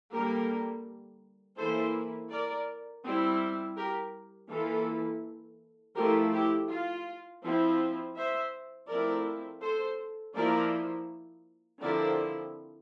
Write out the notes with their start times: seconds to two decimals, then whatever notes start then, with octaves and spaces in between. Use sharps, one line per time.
0.11 D3 G3 A#3 G4 A#4
1.57 E3 A#3 E4 A4 C5
2.31 A#4 D5
3.03 G3 C4 E4
3.77 G4 A#4
4.50 E3 A#3 E4 F4 A4
5.96 F3 A3 E4 G4 A#4
6.33 E4 G4
6.69 F4
7.43 F3 C4 E4
8.16 C5 E5
8.88 F3 A3 C4 E4 A#4 D5
9.62 A4 C5
10.35 F3 A#3 E4 A#4 D5
11.80 D3 F3 C4 E4 A#4 D5